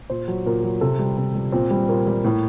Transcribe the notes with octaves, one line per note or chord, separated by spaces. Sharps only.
A#2 C5
F#3
A#2 A#4
F#3
C3 A4
G3
C3
G3
A#2 C4
G3
A#2 A#3
G3
A2